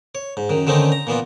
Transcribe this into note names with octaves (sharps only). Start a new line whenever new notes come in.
C#5
G#2
F#2 D#3
D3 D#3 A3 C4 C#4 D#4
A#5
A#2 E3 B3 F4